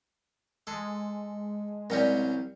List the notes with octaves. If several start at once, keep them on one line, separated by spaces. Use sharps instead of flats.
G#3 A4
C2 F#3 C#4 G4 A#4 D5